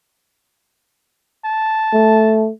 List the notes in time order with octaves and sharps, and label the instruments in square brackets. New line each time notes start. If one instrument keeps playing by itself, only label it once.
[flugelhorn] A5
[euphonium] A3